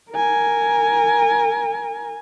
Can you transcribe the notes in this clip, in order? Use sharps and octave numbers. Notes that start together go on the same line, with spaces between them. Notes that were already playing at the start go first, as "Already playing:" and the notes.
A#4 G#5